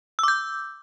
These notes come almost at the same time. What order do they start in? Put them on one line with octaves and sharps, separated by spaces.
E6 D6 G6